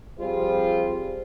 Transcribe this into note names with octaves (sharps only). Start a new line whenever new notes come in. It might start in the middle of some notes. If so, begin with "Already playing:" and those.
F3 G3 C4 F4 G#4 C5